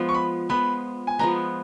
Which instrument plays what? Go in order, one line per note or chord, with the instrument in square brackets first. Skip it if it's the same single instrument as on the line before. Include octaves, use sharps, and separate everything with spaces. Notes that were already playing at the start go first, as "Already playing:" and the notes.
Already playing: [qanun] F3 G#3 B3
[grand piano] C#6
B5
[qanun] F3 G#3 B3 [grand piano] B5
[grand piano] G#5
[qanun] F3 G#3 B3 [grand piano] A#5